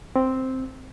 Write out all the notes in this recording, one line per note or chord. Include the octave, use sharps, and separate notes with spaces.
C4